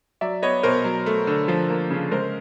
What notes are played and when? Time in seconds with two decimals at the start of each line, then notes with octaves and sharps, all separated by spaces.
0.21 F#3 D5 E5
0.42 B3 C#5 D#5
0.63 B2 A#4 C5
0.84 F#3
1.06 A3
1.27 D3
1.48 F3
1.69 A#3
1.91 C#3
2.11 G#3 A#4 C5